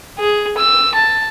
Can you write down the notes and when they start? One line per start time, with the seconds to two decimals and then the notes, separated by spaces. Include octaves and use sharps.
0.19 G#4
0.58 E6
0.94 A5